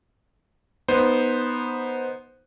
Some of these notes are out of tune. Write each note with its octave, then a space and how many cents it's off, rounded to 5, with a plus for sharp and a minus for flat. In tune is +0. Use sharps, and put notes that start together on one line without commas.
B3 -10 D#4 +0 C5 +0